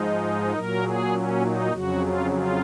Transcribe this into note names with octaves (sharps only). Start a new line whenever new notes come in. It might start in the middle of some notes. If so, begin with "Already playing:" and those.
Already playing: G#2 F3 G#3 D#4
A#2 F#3 A#4
G#4
C#4
D#4
F2 C#3 F#3 F#4
F4
F4